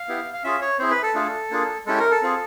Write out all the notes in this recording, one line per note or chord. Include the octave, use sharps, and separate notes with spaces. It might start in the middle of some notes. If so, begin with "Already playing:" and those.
Already playing: F5
B3 E4 G4
F5
C#4 F4 G#4 E5
C#5
C4 E4 G#4 C5
B4
A4
A3 D4 F4 G#4
A#3 D4 F4 G#4
G#3 C#4 E4 G4 A4
A#4
A4
C4 F4 G#4